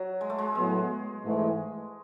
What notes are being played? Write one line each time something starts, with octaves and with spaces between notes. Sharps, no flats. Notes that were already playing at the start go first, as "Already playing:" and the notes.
Already playing: F#3
G#3
A3
G#3
A2 F#3 G#3 B3
G#2 E3 A3